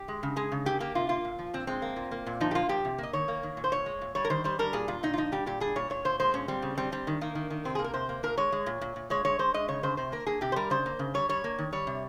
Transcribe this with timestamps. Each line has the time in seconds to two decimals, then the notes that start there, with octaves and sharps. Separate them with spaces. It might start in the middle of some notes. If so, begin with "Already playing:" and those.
Already playing: G4
0.08 G#3
0.23 C#3
0.36 G#3 G#4
0.52 C#3
0.66 A#3 G4
0.80 A#3 G4
0.95 C3 F4
1.09 A#3 F4
1.24 A#2
1.38 F3
1.53 A#2 C4
1.67 G#3 C4
1.82 A#3
1.96 A#2
2.12 A#3
2.26 A#2
2.41 F3 D#4
2.51 G4
2.55 A#3 F4
2.69 F3 G4
2.85 C3
2.98 A#3 D#5
3.13 D#3 C#5
3.28 A#3
3.43 D#3
3.57 A#2
3.64 C5
3.72 A#2 C#5
3.86 G#3
4.01 A#2
4.15 G3 C#5
4.25 A#4
4.30 D#3 C5
4.44 G3 C5
4.59 G3 A#4
4.73 A#2 G#4
4.88 A#2 F4
5.03 A#2 D#4
5.14 F4
5.17 F3 D#4
5.32 G3 G4
5.46 A#2 G4
5.60 G3 G#4
5.76 A#2 C#5
5.90 A#2 C#5
6.05 A#2 C5
6.19 G#3 C5
6.34 A#2 C#4
6.48 G3 C4
6.62 C#3
6.78 G3 C4
6.92 G3 C4
7.07 D#3
7.21 D#3 A#3
7.35 D#3
7.50 D#3
7.65 C3 C4
7.75 A#3 G#4
7.84 A#4
7.94 C3 C5
8.09 A#3
8.23 A#2 A#4
8.37 G#3 C#5
8.52 G#3
8.66 A#2
8.81 A#2
8.96 A#2
9.10 G#3 C#5
9.25 G#3 C#5
9.39 G#3 C5
9.54 G#3 D#5
9.68 C#3 C#5
9.83 C#3 C5
9.97 C3 C5
10.12 A#3 A#4
10.27 A#3 G#4
10.41 C3 G4
10.52 C5
10.56 G3 A#4
10.70 C#3 C5
10.86 A#3
10.99 C#3
11.14 G3 C#5
11.29 G3 C#5
11.44 A#3
11.58 D#3
11.72 G3 C#5
11.87 C3